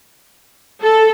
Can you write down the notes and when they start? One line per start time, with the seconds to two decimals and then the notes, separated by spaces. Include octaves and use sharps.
0.83 A4